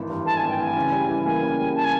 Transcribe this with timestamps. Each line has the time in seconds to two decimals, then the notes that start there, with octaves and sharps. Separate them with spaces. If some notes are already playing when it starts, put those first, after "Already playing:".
Already playing: G#1 E3 A3
0.10 G2
0.26 A3 A5
0.37 G#5
0.43 G#1
0.49 G5
0.60 E3 G#5
0.77 C#3
0.92 G3
1.09 E3
1.25 A#3 G#5
1.43 C#3
1.59 G3
1.76 A5
1.84 G#5